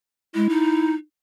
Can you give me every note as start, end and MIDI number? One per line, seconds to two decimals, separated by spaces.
0.35 0.49 56
0.35 0.95 64
0.49 0.94 63